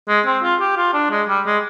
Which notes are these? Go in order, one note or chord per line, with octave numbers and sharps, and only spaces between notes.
G#3
C4
F4
G4
F4
D4
G#3
G3
G#3